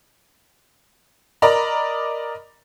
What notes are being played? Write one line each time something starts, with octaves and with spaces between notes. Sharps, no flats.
A#4 D5 D#5 A#5 B5